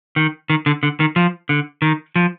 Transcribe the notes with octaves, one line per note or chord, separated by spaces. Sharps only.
D#3
D#3
D3
D3
D#3
F3
D3
D#3
F3